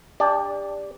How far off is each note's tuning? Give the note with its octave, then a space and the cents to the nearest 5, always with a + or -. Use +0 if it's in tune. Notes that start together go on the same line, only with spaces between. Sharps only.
D4 +0 G4 +30 D5 -10